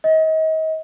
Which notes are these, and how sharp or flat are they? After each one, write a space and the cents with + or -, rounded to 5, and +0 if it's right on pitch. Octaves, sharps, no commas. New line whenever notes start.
D#5 +35